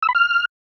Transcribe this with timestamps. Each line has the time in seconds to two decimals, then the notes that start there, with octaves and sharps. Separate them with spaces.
0.03 E6
0.09 B5
0.15 F6